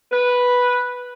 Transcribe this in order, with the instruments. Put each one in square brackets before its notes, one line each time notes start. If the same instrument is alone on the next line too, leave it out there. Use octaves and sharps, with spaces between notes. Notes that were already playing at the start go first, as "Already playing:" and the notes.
[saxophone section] B4